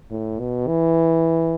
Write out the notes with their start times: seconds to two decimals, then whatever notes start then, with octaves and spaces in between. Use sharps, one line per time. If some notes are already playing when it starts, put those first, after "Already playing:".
0.11 A2
0.39 B2
0.68 E3